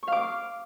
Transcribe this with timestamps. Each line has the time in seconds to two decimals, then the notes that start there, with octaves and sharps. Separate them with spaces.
0.03 C#6
0.08 F5
0.12 D6